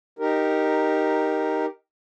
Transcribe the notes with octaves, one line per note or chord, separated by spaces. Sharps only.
D#4 G4 A#4